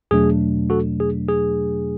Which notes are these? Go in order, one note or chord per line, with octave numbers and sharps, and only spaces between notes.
E2 B2 F#3 A3 D4 G#4
F#4 A4
G#4
G#4